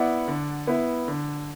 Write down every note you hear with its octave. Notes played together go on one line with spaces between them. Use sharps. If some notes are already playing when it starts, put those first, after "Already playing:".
Already playing: B3 E4 D5 F#5
D3
B3 E4
D3